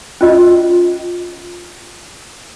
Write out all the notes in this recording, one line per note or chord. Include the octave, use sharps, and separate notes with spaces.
C#4 F4 D#5